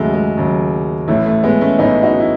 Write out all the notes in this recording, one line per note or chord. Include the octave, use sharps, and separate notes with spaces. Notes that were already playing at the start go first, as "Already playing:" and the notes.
Already playing: D#2 C#3 F#3 G#3 A3
G#3
D#2 C#3 F#3
A1 A2 E3 A3
A3
G#3 B3
A3 C#4
A1 A2 E3 B3 D#4
D#4 F#4
E4